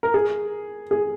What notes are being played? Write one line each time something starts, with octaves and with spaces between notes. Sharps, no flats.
A#4
G#4
G#4